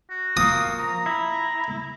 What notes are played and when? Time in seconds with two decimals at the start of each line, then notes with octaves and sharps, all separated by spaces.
0.10 F#4
0.37 F3 A#3 D#6
0.80 A#5
1.06 E4